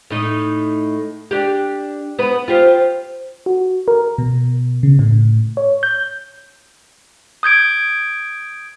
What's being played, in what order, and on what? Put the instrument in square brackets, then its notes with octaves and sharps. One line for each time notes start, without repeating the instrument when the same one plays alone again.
[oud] A2 D#4
D4 G4
B3 B4
F4 G4 C5
[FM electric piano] F#4
A#4
B2
C#3
A2
C#5
G6
[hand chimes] D#6 G6 G#6 D7